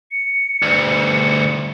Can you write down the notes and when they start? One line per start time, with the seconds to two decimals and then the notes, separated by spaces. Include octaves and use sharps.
0.11 C#7
0.62 D2 G2